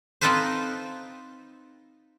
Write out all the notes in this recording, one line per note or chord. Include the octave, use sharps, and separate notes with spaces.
C4 D#4 F4 A4 B4 C5